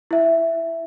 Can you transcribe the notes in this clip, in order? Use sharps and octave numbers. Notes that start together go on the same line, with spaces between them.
E4 E5